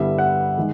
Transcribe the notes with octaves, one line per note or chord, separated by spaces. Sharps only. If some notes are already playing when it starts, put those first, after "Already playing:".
Already playing: G2 D3 G3 B3 E4 E5
F#5
D#3 G#3